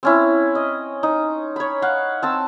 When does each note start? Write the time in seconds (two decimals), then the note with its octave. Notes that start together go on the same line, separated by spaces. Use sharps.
0.03 C4 C#4 E4
0.55 D#5
1.03 D#4
1.56 C#5 B5
1.82 F5 F#5
2.23 C4 A5 E6